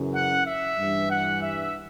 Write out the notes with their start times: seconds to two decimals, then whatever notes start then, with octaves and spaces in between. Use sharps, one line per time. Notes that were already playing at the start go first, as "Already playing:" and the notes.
Already playing: F#2 C#3 E3
0.14 F#5
0.46 E5
0.78 G2 E3
1.10 F#5
1.41 E5